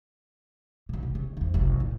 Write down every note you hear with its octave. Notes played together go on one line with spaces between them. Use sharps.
B1 B2
F1
C#3
F2 D#4
F#1 C2
A#2 D#4